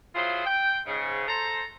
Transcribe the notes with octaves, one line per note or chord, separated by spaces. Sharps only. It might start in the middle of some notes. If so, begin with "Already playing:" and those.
F#3 E4 F4 G#4 C5
G5
G#2 C#3
A4 C5 A#5